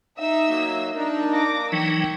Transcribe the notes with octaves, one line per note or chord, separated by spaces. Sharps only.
D#4 E5 E6
F#3 A#3
D4 D#4 A#4
A#3 D6 A#6
E3 F#3 D#4 G5 C#6 E6